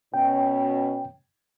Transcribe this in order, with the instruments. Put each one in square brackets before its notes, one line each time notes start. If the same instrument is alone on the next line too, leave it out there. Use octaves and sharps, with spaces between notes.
[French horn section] B2 C#4 [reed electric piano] G5